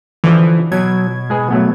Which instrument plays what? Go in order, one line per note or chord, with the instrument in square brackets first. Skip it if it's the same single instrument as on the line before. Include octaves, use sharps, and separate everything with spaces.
[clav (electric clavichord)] D3 F3 [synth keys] E3
[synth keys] B2 G#6 [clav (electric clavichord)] F#3
[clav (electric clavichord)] G#3 G#4 B4
F#3 A3 B3